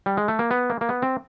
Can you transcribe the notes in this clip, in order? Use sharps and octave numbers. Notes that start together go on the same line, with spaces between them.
G3
G#3
A3
A#3
B3
A#3
A#3
B3
C4